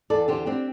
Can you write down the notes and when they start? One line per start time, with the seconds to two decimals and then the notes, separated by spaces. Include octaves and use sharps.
0.10 E2 A4 D5
0.28 D3 G4 C5
0.46 C4 D4 G4